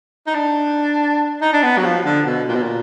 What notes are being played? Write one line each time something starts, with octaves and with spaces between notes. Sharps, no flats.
D#4
D4
D#4
D4
B3
F#3
F3
D3
B2
A#2
B2
A#2